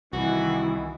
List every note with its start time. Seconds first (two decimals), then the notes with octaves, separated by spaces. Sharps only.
0.13 C2 D#3 E3 E4 F#4